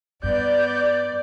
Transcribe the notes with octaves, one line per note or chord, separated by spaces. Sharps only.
G2 B3 D5 G6